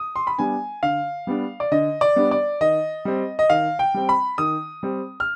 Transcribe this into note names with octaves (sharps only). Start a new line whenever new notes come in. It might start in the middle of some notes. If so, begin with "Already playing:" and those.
Already playing: D#6
C6
B5
G3 B3 D4 G#5
D3 F5
G3 B3 D4
D5
D3 D#5
D5
G3 B3 D4
D5
D#3 D#5
G3 C4
D#5
D#3 F5
G5
G3 C4
B5
D#3 D#6
G3 C4
F6